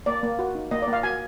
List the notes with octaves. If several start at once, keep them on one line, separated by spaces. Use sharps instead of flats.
A#3 D5
A#3
F#4
D#4
A#3 D#5
D5
A#3 F5
F#4 G#5